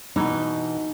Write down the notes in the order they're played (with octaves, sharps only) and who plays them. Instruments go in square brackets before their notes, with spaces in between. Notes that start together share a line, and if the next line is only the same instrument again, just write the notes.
[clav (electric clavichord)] B2 E3 [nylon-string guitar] D#4